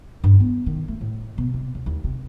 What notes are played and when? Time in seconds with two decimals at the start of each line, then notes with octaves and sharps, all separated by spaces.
0.24 G2
0.40 B3
0.66 D#3
0.88 A3
1.01 A2
1.38 B2
1.54 C3
1.75 C#2
1.86 D#2
2.04 C3